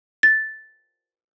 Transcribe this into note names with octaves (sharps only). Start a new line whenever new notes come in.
A6